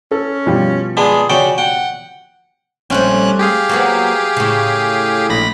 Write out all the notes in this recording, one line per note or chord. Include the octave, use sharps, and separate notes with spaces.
C#4 A4
B2 F3 G3
G#3 B3 D4 G#4
C#3 F#4 D5 G5
F#5 G5
A#1 G3 A3 C4 C#4 F#6
G4 G#4 F5
F#3 A#3 B3
A2 C#3
A#1 B5 A#6